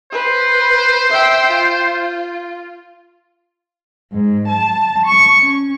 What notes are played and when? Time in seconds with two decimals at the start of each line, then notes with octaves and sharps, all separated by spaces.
0.12 B4 C5
1.10 E5 G5
1.51 F4
4.12 G#2
4.48 A5
5.06 C#6
5.38 C#4